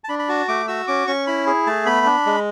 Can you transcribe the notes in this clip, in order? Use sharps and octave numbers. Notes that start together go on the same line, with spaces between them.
A5
D4 B5
B5
F#4 A5
A3 D6
F#4 E6
C#4 D6
C#4 C#6
E4 B5
G#4
A3 A5
B3 B5
D4
G#3